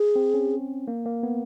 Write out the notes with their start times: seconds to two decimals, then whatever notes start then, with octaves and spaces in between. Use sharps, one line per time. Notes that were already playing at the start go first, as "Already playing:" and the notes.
Already playing: G#4
0.16 C4
0.34 C#4
0.88 A#3
1.06 A#3
1.23 B3